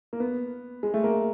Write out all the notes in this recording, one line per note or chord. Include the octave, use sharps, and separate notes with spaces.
A#3
B3
G#3
A3
A#3